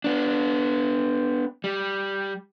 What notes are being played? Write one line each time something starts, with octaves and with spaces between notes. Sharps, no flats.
B3 D4
G3